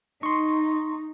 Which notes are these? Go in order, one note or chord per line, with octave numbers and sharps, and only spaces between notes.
D#4 C6 C#6